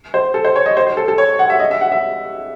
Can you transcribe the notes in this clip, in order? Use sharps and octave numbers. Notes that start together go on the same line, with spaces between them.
C5
A4
C5
C#5
D#5
C5
C5
A4
A4
C#5
F#5
E5
D#5
E5
F#5
E5